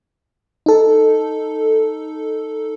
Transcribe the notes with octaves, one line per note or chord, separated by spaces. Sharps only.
D#4 A4